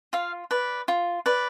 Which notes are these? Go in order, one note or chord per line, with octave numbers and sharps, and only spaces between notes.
F4 F5
B4 D5
F4
B4 D5